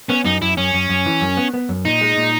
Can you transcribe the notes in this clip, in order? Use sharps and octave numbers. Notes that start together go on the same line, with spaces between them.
B3 C#4
F#2 D#4
F#2 E4
F#2 C#4
F#2
F#2
E3
F#2
B3
B3
F#2
A#2 D#4
G#3
A#2